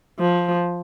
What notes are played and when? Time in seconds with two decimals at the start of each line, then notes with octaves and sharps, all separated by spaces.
0.19 F3